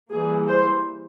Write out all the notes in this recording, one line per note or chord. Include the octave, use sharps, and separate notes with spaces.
E3 G3 A#3 G#4
C5